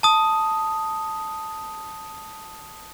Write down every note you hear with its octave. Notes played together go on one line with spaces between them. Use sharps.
A5 D#6